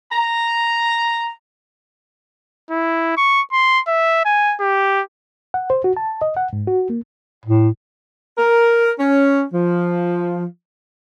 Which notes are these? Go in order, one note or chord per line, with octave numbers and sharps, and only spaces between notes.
A#5
E4
C#6
C6
E5
G#5
G4
F#5
C5
F#4
A5
D#5
F#5
G#2
F#4
A#3
A2
A#4
C#4
F3